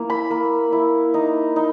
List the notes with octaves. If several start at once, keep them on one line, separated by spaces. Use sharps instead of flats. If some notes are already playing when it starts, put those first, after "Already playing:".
Already playing: A#3 E4
B5
A#3
E4
D#4
D#4